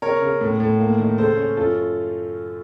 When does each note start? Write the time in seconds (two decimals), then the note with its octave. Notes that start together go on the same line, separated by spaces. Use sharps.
0.02 C#3 A#4 C#5
0.22 C#3
0.41 A2
0.60 A2
0.80 A#3
0.99 D#3
1.18 C#3 A4 C5
1.37 C#4
1.57 F#2 F4 A4